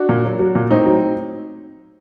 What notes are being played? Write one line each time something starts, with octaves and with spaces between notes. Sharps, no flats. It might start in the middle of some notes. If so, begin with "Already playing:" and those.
Already playing: D4 F#4
A#2
F#3
F#3
A#2
A2 C4 D#4
F#3